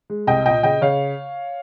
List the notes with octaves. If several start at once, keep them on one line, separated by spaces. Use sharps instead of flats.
G#3
C2 D#5 G5
A#2 D#5 G5
C#3 D#5 G5
C#3 C#5 F5